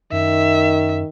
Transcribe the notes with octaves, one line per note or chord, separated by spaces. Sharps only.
F#2 D#3 E5